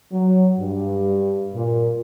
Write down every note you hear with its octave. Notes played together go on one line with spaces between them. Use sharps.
F#3
G2
A#2